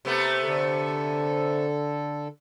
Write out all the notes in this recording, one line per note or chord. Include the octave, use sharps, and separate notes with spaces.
C3 A3 B3
D3 A4